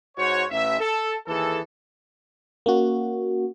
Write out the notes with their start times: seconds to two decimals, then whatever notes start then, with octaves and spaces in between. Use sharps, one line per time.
0.17 G#2 F#4 C5 C#5
0.50 A1 E5
0.80 A4
1.26 D#2 E3 G#4 A4
2.66 A#3 C#4 F#4